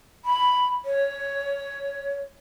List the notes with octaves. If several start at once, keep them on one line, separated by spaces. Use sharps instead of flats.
B5
C#5